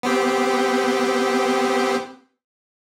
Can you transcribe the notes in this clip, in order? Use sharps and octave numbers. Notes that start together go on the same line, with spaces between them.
B3 C4 G4